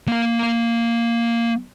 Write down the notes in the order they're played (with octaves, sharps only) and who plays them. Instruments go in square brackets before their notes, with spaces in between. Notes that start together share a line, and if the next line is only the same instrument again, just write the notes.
[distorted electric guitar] A#3 F5